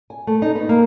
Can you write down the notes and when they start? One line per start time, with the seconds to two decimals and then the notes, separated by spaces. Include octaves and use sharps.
0.10 G#5
0.27 A3
0.42 D#4
0.55 B3
0.69 A#3